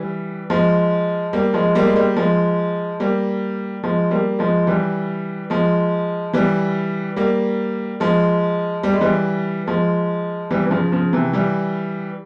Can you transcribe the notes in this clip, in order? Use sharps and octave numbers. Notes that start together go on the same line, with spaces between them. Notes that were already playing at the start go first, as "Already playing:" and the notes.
Already playing: E3 G3
F3 G#3
G3 A#3
F3 G#3
G3 A#3
G#3
G3 A#3
F3 G#3
G3 A#3
F3 G#3
G3 A#3
F3 G#3
E3 G3
F3 G#3
E3 G3
G3 A#3
F3 G#3
G3
G#3
E3 G3
F3 G#3
E3 G3
E3
C#3 F3
C#3 F3
C3 E3
E3 G3